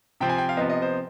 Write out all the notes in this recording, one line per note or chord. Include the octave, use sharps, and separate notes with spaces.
C3 F3 C4 G5
G#5
G5
F5
C3 F3 B3 D#5
D#5
C5